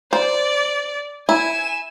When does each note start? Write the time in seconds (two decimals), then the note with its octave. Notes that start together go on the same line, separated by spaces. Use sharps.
0.13 C5 D5
1.29 E4 G#5 E7